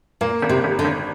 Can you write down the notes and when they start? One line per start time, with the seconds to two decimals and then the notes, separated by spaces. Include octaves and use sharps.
0.21 A#2 A#3
0.42 G#1
0.49 C3
0.64 G#1
0.79 D3
0.85 G#1